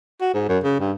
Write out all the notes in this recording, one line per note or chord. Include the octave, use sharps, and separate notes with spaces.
F#4
G#2
F#2
C#3
G2